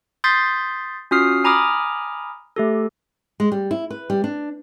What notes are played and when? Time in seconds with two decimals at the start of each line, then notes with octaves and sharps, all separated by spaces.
0.24 C6 D#6 G6 A6 B6 C7
1.11 C#4 F4 F#4 D#6 F6 C7
1.44 G#5 A#5 B5 D6 D#6 F6
2.56 A3 G4 A4
3.40 G#3
3.52 G3
3.71 E4
3.90 B4
4.10 G3
4.24 D4